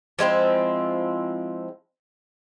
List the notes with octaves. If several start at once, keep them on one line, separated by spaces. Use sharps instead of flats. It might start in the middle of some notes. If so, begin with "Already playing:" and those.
F3 G#3 C4 E4